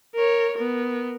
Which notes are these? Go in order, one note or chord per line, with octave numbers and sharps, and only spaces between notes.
A#4 C#5
B3 A#4